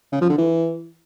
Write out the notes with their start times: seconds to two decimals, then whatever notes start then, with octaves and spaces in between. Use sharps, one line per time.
0.13 C#3
0.21 F3
0.30 D3
0.38 E3